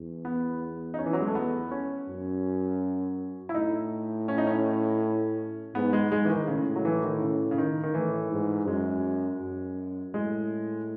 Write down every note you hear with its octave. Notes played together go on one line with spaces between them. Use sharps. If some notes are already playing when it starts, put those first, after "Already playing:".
Already playing: E2
B3
D#4
C#4
E3
F#3
G#3
A3
B3
C#4
F#2
E4
A2 D#4
C#4
D#4
C#4
G#2 B3
G#3
G#3
E3
D#3
A2 C#3
F#3
E3
D#3
C#3
C#3
D#3
D#3
A2 E3
G#2
F#2 G#3
F#2
A2 G#3